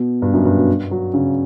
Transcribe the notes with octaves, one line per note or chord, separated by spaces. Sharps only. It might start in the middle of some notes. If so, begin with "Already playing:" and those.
Already playing: B2
G2
F#2
G2
B2
F#3
C#3